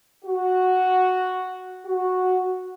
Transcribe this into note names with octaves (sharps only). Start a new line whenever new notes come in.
F#4
F#4